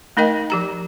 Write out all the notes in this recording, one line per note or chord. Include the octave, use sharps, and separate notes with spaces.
A3 D#4 A#4 D#5 G5
F3 G4 A#5